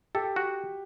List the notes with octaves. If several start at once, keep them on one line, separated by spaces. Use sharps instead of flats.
G4 A4
F#4